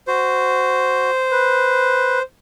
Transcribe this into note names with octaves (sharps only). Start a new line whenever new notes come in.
F#4 C5
B4